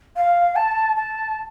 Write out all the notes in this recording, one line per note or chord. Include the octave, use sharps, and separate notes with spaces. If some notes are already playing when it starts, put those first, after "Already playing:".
F5
A5
A5